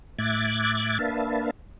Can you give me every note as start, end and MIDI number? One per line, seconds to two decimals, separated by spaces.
0.18 0.98 45
0.18 0.98 76
0.18 0.98 86
0.18 0.98 90
0.18 0.98 92
0.18 0.98 93
0.99 1.50 58
0.99 1.50 62
0.99 1.50 71
0.99 1.50 76
0.99 1.50 77
0.99 1.50 81